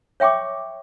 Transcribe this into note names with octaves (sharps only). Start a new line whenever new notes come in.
C#5 E5 G5 C#6 D6